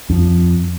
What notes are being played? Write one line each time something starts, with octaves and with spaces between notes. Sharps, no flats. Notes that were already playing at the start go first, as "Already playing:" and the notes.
F2